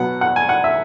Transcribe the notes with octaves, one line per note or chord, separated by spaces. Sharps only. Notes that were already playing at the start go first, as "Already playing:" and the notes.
Already playing: B2 F#3 B3 F#5
F#5
G#5
F#5
E5